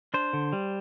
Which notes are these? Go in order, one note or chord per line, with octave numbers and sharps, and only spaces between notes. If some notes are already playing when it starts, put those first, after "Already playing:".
D4 C5
D3
G3